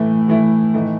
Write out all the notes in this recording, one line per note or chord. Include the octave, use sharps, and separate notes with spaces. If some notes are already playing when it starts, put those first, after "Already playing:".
Already playing: A2 E3 A3 E4
A2 E3 A3 E4
A2 E3 A3 D#4